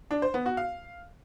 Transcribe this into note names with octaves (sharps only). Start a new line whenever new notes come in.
D4
C5
B3
F#4
F5